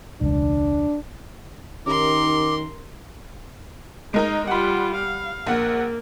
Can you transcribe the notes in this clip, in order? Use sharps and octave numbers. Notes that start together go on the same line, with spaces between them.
E1 C#2 D4
D#3 C#4 D#4 G4 A#4 C6 D6
G#3 D#4 A#4 D#5
G3 F4 F#5 B5
F5
A#1 A#3 F#5